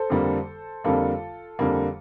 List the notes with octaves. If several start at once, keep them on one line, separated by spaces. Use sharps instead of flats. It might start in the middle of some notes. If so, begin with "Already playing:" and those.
Already playing: A4 C5
F2 D3 G3 A#3
F2 D3 G3 A#3 F4 A4
F2 D3 G3 A#3